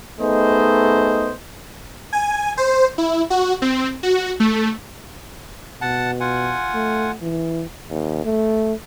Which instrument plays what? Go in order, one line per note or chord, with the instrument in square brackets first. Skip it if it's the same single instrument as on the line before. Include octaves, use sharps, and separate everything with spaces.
[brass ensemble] A3 B3 D#4 G#4 C5 D#5
[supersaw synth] G#5
C5
E4
F#4
C4
F#4
A3
[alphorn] B2 [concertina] F#5 A5
[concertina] F4 F#5 G#5
[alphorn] A3
E3
[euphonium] D#2
A3